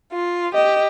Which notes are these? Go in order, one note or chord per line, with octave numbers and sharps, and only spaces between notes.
F4
G4 D#5